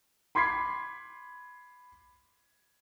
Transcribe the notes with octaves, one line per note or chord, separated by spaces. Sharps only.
B5 C6 D6 G#6 B6 C7